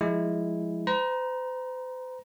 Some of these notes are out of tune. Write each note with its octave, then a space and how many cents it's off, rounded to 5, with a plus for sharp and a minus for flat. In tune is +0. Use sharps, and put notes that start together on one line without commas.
F3 +0 G#3 +0 E4 +0
C5 -40 A#5 +20